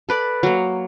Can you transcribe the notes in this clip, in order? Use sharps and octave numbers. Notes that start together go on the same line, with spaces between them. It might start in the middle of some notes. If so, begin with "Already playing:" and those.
A4 B4 D5
F#3 A#3